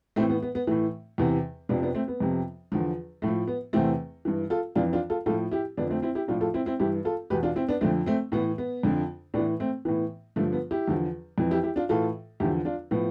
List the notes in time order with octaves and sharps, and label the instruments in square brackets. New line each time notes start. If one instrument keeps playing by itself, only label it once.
[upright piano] A2 E3 A3 C4
B3
B3
B3
A2 E3 A3
E2 C3 E3 B3
F2 C3 F3 B3 D4
B3 D4
A3 C4
B3
F2 C3 F3
E2 D3 F3
A2 F3 A3
B3
E2 C3 E3 A3 C4
G2 E3
F4 A4
F2 E3 D4 F4
D4 F4
F4 A4
A2 F4 A4
F3
E4 G4
F2 D3 F3 B3 D4
A3 C4
C4 E4
E4 G4
A2 D4 F4
F3
F4 A4
C4 E4
C4 E4
G2 E3 E4 G4
F4 A4
E2 B2 G4 B4
D4 F4
C4 E4
B3 D4
F2 D3 F3 A3 C4
A3 C4
A2 E3 B3
B3
F2 D3 F3
A2 B3 D4
E3
A3 C4
A2 E3 B3
G2 D3 F3 A3
B3
E4 G4
E2 D3 F3
F2 E3
E4 G4
E4 G4
D4 F4
A2 E3 F4 A4
E2 D3 F3 E4 G4
D4 F4
A2 F3 B3